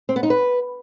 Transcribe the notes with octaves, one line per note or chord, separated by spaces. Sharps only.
C4
B3
D#4
B4